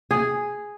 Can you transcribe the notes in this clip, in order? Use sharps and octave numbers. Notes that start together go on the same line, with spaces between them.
G#4